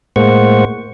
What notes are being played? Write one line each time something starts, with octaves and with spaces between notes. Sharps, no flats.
A2 G#3 A#3 C5 F#5 C#6